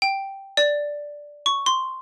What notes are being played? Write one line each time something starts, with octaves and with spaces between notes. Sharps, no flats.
G5
D5
C#6
C6